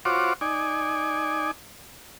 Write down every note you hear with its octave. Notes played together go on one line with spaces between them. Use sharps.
F4 F#4 C5 C#5 D6
D#4 D5 G#5